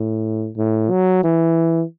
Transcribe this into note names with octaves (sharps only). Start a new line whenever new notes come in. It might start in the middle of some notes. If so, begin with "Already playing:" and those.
Already playing: A2
A2
F#3
E3